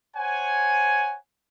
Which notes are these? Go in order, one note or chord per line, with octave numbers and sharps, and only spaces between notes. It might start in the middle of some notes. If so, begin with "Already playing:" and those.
C5 C#5 F#5 G#5